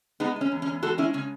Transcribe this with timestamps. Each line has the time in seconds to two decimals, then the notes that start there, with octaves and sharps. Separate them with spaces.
0.20 G#3 B3 D#4
0.36 G#3 C#4
0.52 E2
0.62 C#4
0.68 E2
0.82 G#3 F#4 A4
0.98 G#3 C#4 E4
1.13 C#3 C#4